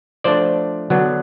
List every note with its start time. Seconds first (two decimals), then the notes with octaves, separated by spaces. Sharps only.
0.24 F3 A3 D4 C5 D5
0.90 D3 F#3 B3 D4